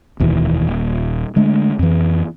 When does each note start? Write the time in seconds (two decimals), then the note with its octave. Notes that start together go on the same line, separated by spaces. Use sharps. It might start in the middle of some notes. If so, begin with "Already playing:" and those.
0.20 F1 D#2 B2 E3
0.67 D#1
1.36 D3 G#3 A3 D4
1.79 F2 E3